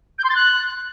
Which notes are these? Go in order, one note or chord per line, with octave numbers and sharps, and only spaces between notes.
G6
C6
A6
F#6